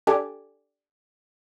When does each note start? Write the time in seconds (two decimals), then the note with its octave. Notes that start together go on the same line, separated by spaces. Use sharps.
0.07 D4 G4 A4 D5 G#5